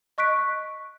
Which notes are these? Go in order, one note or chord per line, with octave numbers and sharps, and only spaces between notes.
D#5 C#6 F#6 B6 D7